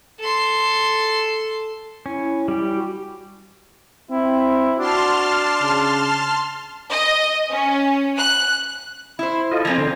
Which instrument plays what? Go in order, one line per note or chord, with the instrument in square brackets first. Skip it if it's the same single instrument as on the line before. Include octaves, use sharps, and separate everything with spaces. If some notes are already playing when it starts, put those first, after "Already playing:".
[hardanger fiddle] A4 C6
[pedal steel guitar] C#4 [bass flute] E4
[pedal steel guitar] G3 G4
[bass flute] F#4
[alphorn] C4 [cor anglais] E4
[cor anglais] D4 [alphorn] F#4 [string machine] A5 C6 F6
[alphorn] C#3
[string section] D#5
C#4
F#6
[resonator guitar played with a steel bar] E4 C5 [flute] B5
[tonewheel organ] F4 D#5 [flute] A4
[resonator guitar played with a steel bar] F3 A#3 C4 [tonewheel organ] G#5 A#5
[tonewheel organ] D3 [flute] C5